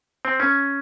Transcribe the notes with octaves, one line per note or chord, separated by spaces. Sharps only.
C4
C#4